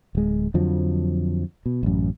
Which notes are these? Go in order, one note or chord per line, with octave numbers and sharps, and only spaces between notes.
D1 G#3
F2 D3 F3 F#3
B2
A1 F#2